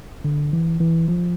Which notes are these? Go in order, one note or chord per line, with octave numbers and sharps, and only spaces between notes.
D3
E3
E3
F3